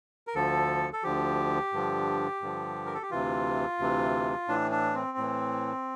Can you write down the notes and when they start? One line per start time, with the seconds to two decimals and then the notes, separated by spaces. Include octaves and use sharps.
0.27 A#4
0.35 D2 D3 F3 A4
0.93 A4
1.03 D2 D3 F3 G4
1.72 G2 D3 F3
2.41 G2 D3 F3
2.86 A#4
2.94 A4
3.02 G4
3.11 D2 C3 E3 F4
3.79 D2 C3 E3
4.48 A2 E3 D4
4.71 D4
4.94 C4
5.18 A2 E3